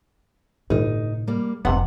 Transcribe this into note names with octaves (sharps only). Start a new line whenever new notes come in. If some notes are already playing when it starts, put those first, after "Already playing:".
G1 A2 C3 D#4
G3 A#3
F1 F2 G#2 C3 B3 F#5